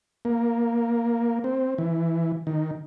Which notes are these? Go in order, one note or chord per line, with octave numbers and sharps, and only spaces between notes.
A#3
C4
E3
D#3